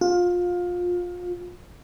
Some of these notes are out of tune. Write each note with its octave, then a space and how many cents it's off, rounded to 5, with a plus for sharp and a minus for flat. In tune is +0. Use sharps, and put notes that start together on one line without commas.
F4 +25